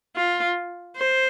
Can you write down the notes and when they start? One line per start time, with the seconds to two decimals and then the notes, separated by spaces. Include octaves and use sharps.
0.16 F4
0.97 C5